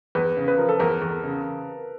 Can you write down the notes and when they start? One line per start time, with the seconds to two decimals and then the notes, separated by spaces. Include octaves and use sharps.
0.15 E2 B4
0.37 C#3
0.48 B4
0.58 F3 A#4
0.69 A4
0.79 E2 A#4
1.02 E2
1.24 C#3